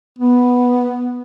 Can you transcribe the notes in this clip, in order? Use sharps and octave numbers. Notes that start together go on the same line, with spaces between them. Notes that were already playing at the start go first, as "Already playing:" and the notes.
B3